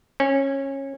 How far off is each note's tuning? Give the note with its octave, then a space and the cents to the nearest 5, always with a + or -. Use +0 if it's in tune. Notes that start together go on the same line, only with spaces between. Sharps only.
C#4 -20